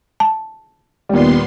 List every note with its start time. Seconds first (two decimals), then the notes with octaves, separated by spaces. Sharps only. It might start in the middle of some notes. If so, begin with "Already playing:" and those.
0.20 A5
1.09 D#2 A#2 G3 B3 C6